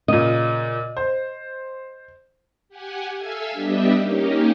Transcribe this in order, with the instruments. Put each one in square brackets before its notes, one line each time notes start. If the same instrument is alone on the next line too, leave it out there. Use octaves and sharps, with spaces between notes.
[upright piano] A#2 C#3 [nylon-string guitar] D#5
[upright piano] C5
[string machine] G4 F#5 G#5
A4 E5 F5 G#5 E6
G3 B3 D4 G4 D#5 E5
A#3 C#4 D#4 G4